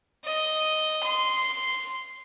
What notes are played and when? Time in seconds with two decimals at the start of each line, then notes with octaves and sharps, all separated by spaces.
0.25 D#5
1.03 C6